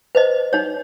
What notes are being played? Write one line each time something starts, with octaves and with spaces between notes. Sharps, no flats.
B4 C5 D#5
D#4 C#5